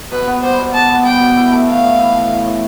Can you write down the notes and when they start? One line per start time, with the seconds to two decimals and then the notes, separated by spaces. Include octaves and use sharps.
0.11 B2 B4
0.27 B3
0.42 G3 C5
0.58 B2
0.73 B2 A5
0.89 B3
1.05 G3 G5
1.21 B2
1.36 E4
1.51 A3
1.67 E3 F5
1.83 A2
1.99 E4
2.14 A3
2.30 E3
2.46 A2